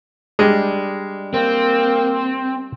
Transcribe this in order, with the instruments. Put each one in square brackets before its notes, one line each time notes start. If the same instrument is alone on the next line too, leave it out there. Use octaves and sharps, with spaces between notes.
[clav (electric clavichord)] G3 D4 [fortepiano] G#3
[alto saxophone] A#3 [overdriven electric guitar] C4